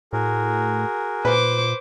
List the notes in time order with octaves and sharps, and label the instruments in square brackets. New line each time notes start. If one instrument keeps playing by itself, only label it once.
[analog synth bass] A2 [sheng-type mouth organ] F#4 G#4 A#4
[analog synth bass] A#2 [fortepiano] B4 [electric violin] C5 D6